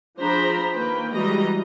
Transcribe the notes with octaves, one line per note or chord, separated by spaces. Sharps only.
F3 D4 G#4 C5 A#5 B5
D#3 A#3 B4 G5
E3 G3 G#3 F#4 D#5 A#5